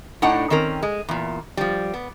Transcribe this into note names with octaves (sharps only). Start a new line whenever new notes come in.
A2 D4 D#4 F#5
D#3 C4 C#4 A#4
G#3
E2 A#2
F3 G3
B3